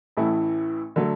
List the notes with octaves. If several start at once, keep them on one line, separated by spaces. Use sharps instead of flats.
A1 A2 E3 A3 E4
D3 F#3 A3